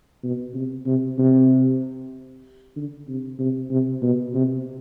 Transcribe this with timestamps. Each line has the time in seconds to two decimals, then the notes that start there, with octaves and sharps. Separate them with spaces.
0.23 B2
0.54 C3
0.86 C3
1.18 C3
2.76 D3
3.08 C3
3.39 C3
3.71 C3
4.02 B2
4.34 C3